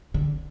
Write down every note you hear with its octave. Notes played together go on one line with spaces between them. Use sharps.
D3